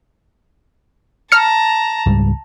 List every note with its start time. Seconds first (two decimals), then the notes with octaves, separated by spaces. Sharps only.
1.32 A5 A#5 F6 C#7
2.06 C#2 G#2 G3